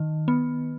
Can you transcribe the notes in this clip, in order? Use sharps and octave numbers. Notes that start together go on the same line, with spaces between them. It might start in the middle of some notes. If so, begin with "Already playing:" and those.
Already playing: D#3
B3